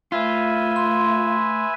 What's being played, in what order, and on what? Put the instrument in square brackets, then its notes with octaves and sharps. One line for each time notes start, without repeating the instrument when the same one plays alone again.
[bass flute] A3 [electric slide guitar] F4 [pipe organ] B4 E5 G#5
[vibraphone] C6